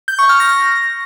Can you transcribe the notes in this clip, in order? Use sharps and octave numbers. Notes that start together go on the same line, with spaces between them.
G6
C#6
F6
A#6